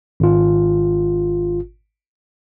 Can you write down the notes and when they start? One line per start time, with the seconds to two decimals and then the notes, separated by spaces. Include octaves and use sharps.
0.20 G#1 F4